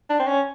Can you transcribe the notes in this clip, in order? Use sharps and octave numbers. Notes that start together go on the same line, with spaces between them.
D4
C4
C#4